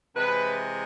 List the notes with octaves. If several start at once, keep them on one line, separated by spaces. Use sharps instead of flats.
C3 E3 G#3 B4